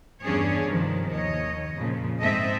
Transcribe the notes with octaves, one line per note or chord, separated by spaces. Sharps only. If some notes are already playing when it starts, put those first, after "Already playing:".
E2 G2 C#4 D4 G#4 C#5
G2 C3 D#3 F3
D#2 C#5 D#5
F2 A#2 C#3 F3
G#2 C4 A4 D#5 E5